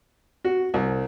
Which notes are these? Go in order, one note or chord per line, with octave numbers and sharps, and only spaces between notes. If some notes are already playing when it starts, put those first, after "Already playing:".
F#4
C2